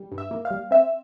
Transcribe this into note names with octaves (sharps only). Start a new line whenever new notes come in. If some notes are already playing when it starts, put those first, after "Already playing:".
Already playing: G3
G2
E5
A#3
F5
G3
C4 E5